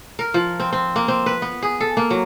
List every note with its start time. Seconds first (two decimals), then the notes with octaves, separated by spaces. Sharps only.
0.19 A#4
0.34 F3
0.60 C4
0.73 C4
0.96 A#3
1.08 C4
1.26 B4
1.42 B3
1.62 G#4
1.81 A4
1.97 A#3
2.11 F#3